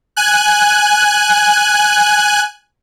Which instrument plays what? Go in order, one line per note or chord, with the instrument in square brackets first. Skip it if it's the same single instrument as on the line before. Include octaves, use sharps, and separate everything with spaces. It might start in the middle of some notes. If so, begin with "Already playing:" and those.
[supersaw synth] G#5 F#6